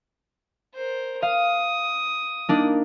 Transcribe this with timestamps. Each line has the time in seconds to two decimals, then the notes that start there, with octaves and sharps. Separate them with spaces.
0.74 A#4 C5
1.22 F5 D#6
2.49 A#3 D4 D#4